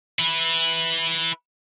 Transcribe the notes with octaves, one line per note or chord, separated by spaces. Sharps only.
E4 B4